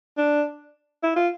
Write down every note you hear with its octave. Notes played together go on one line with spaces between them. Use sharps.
D4
E4
F4